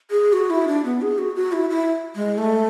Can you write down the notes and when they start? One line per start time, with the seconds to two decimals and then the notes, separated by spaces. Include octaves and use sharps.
0.10 G#4
0.33 F#4
0.50 E4
0.68 D4
0.85 B3
1.01 G#4
1.18 F#4
1.36 F#4
1.52 E4
1.70 E4
2.15 G#3
2.38 A3